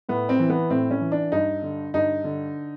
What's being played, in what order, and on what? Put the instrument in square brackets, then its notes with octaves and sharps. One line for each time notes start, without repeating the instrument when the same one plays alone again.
[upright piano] A2 B3
C4
E3
B3
A2 C4
C#4
E3
D4
G2 D#4
D3
G2 D#4
D3